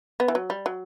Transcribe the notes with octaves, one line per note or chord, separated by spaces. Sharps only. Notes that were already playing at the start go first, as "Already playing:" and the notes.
B3
E3
F#3
G3
F#3